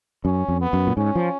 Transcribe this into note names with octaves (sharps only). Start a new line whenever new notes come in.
F#2 C#4
F2
B3
F#2
A#2
G#2 C#4
F3